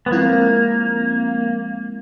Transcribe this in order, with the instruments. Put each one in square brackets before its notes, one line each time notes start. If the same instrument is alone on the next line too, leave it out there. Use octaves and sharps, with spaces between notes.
[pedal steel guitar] B3
[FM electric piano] F3 G#3 C4 E4 [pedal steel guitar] A#3